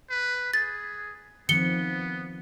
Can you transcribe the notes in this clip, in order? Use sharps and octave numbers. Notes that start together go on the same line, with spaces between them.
B4
G#4 A6
D#3 F3 B3 C4 C#7 G7